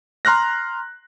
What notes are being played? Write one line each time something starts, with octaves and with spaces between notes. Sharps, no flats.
A#5 C6 F6 F#6 A#6